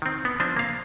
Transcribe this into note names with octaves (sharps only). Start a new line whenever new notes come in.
D#3 C4
B3
F3 C4 D4 C5
A#3 F5